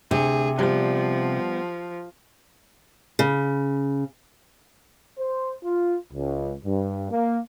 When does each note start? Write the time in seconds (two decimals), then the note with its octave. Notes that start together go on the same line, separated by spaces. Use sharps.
0.11 D2 C3 G#4
0.59 F3 G3 B3
3.19 C#3
5.18 C5
5.64 F4
6.13 C#2
6.65 G2
7.11 A#3